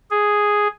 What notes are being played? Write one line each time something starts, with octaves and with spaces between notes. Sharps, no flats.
G#4